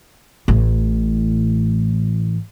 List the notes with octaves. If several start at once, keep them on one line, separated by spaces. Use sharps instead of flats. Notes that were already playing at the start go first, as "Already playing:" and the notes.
A1 A2